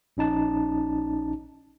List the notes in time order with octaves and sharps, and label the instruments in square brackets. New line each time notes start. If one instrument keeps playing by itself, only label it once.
[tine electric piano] A#1 C#4 D#4 A5